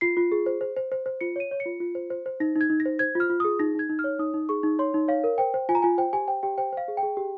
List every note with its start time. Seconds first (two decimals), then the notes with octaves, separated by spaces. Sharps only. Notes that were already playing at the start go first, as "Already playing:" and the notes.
0.01 F4 C7
0.17 F4
0.32 G#4
0.46 C5
0.61 C5
0.76 C5
0.92 C5
1.06 C5
1.21 F4 C#7
1.36 C#5 D#7
1.51 C#5
1.60 C#7
1.66 F4
1.80 F4
1.95 C5
2.10 C5
2.26 C5
2.40 D#4 A#6
2.56 D#4
2.61 G#6
2.70 D#4
2.80 A#6
2.85 C5
2.99 C5 G#6
3.15 F4 F6
3.30 F4
3.40 G#4 D#6
3.59 D#4 A#6
3.75 D#4 G#6
3.89 D#4
3.99 F6
4.04 C#5
4.19 D#4 D#6
4.34 D#4
4.49 G#4 C#6
4.63 D#4
4.79 C#5 C6
4.94 D#4
5.08 C#5 F5
5.24 A#4
5.38 C5 G5
5.54 C5
5.69 F4 G#5
5.75 A#5
5.82 F4 G#5
5.98 C5 G5
6.13 G4 G#5
6.28 C5 G5
6.43 G4 G5
6.58 C5 G5
6.73 C5 F5
6.88 G#4
6.97 G5
7.03 G#4
7.17 G4